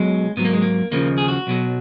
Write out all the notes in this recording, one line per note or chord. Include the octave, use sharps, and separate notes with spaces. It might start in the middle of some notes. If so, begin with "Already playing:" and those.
Already playing: B1 B2 F#3 G#3
G#2 F#3 B3
A#3
G#3
A#3
D#2 C#3 F3 A#3
G#4
F#4
B1 B2 F#3